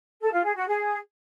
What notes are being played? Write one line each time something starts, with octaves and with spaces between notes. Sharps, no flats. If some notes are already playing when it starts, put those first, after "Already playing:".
A4
F4
G#4
F#4
G#4